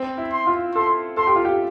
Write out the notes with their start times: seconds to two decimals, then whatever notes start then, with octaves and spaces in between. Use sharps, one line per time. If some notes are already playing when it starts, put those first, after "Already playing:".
Already playing: C4
0.18 E4
0.32 C6
0.47 F4
0.75 A4 C6
1.17 A4 C6
1.27 G4
1.36 F4
1.45 G4